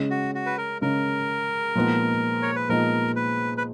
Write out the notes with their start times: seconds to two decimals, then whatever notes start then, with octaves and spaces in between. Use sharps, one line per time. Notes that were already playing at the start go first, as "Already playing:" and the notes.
Already playing: C#3 G#3 C#4
0.10 F#4
0.35 F#4
0.46 B4
0.58 A#4
0.81 C#3 G#3 C#4 A#4
1.75 A#2 F3 G#3 B3 D#4
2.42 C#5
2.56 B4
2.69 A#2 F3 G#3 B3 D#4 A#4
3.16 B4
3.58 B4